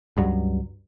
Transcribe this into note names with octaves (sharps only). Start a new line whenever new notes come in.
C#2 G2 F#3